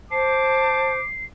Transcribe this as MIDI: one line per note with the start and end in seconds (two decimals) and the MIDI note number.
0.11 0.98 72
0.11 0.92 81
0.11 1.07 86
0.11 1.24 96